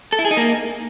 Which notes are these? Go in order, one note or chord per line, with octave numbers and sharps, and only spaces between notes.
A4
E4
G#4
D#4
A#3